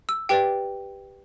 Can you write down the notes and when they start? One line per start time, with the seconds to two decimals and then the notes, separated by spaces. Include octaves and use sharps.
0.09 E6
0.29 G4 B4 D5 G5